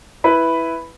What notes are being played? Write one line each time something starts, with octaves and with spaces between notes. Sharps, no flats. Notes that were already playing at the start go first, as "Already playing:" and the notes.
E4 B4 B5